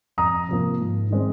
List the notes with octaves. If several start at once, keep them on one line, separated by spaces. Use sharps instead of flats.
F2 A#5 D#6
C3 F3 A#3
G#2
D#3 G#3 C4